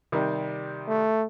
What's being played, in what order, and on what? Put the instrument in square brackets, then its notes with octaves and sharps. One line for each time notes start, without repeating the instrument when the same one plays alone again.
[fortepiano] C3 D#3 G3
[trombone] A3